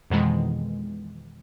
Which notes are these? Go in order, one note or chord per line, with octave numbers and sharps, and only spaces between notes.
F2 B2 D#3 E3 G#3